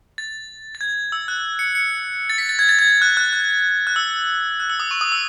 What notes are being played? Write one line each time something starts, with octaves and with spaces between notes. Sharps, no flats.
A6
A6
G#6
E6
F#6
C#7
C#7
A6
B6
A6
G#6
A6
G#6
F#6
F#6
F#6
F#6
E6
F#6
E6
D#6
C#6
D#6
E6